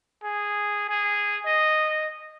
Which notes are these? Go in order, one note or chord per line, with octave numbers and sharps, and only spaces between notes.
G#4
G#4
D#5